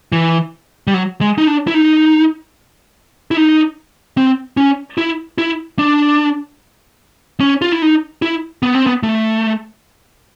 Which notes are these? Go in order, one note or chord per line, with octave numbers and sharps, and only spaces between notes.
E3
G3
F#3
G#3
D#4
D4
E4
D#4
E4
D#4
C4
C#4
E4
E4
D4
C#4
F4
E4
D#4
E4
B3
C4
B3
A3